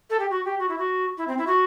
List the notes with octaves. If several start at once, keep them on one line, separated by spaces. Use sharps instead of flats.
A4
G4
F#4
G4
F#4
E4
F#4
E4
C4
E4
F#4